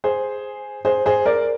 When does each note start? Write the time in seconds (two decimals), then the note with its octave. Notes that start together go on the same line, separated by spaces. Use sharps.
0.04 G#4 C5
0.85 G#4 C5
1.06 G#4 C5
1.26 A#4 D5